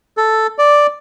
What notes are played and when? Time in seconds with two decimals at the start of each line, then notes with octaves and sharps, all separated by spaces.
0.17 A4
0.58 D5